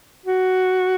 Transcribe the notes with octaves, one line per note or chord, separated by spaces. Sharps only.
F#4